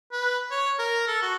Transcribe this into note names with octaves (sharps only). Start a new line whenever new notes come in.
B4
C#5
A#4
A4
F#4